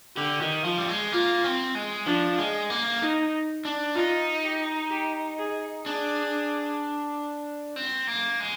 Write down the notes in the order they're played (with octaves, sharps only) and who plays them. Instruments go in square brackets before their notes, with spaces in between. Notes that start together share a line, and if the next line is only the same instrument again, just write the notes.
[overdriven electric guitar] D3 [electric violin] G4
[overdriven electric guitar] D#3
F3
G3
G#3
[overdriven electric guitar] A#3 [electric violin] F4
[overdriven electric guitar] C4
G#3
[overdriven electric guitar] F3 [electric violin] D4
[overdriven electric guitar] G#3
A#3
[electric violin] D#4
[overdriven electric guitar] D4
[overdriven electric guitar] D#4 [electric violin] F4
[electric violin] G4
G4
G#4
[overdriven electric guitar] D4 [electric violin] G#4
[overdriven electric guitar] C4
A#3
G#3